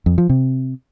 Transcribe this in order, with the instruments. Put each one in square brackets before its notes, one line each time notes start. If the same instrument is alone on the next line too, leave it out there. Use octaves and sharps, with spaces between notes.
[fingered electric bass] F2
F3
C3